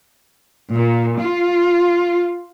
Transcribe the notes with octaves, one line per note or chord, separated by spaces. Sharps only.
A#2
F4